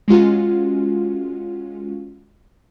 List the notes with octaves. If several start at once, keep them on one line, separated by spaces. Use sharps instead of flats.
G#3 C#4 F4 F#4